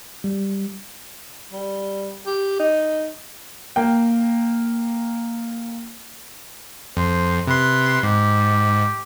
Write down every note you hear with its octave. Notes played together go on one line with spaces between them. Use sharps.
G3
G3
G4
D#4
A#3 G5
F2 C5
C3 B4 C6
G#2 G4